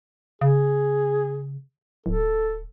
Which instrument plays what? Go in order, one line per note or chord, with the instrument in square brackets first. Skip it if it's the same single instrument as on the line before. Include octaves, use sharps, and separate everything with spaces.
[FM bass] C#3 [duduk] G#4
[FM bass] D1 [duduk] A4